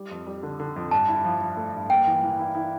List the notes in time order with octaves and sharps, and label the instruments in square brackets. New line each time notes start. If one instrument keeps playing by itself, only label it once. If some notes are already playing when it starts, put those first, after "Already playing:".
Already playing: [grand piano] G3
F2
G3
D3
D3
F2
[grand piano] G2 [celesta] A5
[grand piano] E4
F3
F3
A3
G2
[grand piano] A#3 [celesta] G5
[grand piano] E3
E3
E4
E4